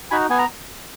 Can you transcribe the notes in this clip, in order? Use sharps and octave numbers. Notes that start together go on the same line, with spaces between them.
D#4 F#4 G#5 B5
B3 G#5
A#5